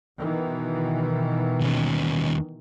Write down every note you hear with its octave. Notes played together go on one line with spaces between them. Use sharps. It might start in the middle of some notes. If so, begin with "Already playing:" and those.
B2 D#3 E3
D#2 C#4